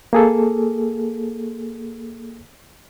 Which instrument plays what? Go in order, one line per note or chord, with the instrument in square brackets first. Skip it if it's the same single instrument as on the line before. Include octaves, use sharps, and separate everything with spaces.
[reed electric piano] A#3 G#4 A4